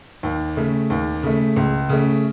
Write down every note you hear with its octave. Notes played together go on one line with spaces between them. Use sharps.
D#2
C#3 A3
D#2
C#3 A3
C#2
C#3 A3